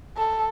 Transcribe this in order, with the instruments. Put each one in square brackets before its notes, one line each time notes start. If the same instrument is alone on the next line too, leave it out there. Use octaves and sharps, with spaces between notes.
[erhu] A4